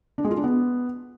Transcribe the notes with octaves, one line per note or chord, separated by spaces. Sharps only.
D4
G#3
F4
D4
B3